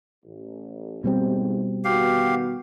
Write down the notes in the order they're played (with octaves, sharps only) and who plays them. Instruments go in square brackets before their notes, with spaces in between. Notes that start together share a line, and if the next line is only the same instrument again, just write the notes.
[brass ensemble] A1
[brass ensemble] A1 D#2 G#2 [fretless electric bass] B2 G3 C4
[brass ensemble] D#3 B3 F#4 [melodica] G4 F5